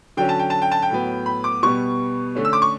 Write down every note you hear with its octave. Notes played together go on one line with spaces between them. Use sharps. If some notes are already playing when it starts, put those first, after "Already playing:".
D3 F#3 C#4 G5
A5
G5
A5
G5
A5
G5
A2 F#3 B3
B5
D6
B2 G3 B3 C#6
D3 A3 C#4
E6
D6
C#6